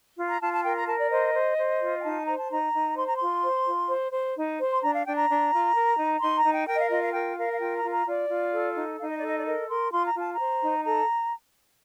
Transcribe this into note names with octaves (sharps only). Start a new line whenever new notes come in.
F4
A#5
F4 A5
A5
A#4 G5
A#5
A#4 A5
D5
C5 D#5
C5
C5
F4
G5
D#4 A5
C5 A#5
A5
D#4 A#5
D#4
C5 C6
A#5
F4 C6
C5
F4
C5
C5
D#4
C5
C6
D4 A#5
F5
D4 G5
A#5
D4
F4
A#4
D#4
D#4 C6
A#5
D#4
G5
A#4 G5
D#5
F5
F4 D#5
F5
A#4 G5
A#4 F5
F5
F4 G5
A#5
F4
A#5
F4 D5
F4
A4
D#4
D#4 F5
D#5
D5
A4 D#5
D5
A#4 D#5
A#4 C6
F4 C6
A#5
F4 A5
A#5
C5
D#4
A4 A#5